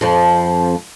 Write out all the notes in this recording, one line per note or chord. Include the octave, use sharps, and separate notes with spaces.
F2 F3